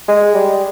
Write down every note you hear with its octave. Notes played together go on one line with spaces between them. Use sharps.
G#3
G3